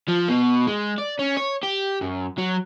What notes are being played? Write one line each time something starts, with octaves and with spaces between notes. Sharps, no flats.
F3
B2
G#3
D5
C#4
C#5
G4
F#2
F#3